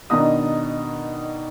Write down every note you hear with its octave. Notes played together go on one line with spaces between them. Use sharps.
B2 D#3 D4 D#4 A#5 D#6